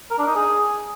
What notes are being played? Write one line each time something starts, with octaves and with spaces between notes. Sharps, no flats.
A#4
D4
D#4
G#4